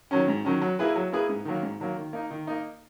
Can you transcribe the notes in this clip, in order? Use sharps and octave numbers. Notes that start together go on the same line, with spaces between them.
D#3 F#3 C#4
G#2
D#3 F#3 C#4
F#3
A#3 E4 G#4 B4
F#3
A#3 E4 G#4 B4
G#2
D#3 F#3 A#3
G#2
D#3 F#3 A#3
D#3
A#3 D#4
D#3
A#3 D#4